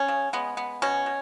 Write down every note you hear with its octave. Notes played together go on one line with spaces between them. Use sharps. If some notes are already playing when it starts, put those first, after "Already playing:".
Already playing: C#4
C#3
G#3 B3
B3
B2 C#4
B2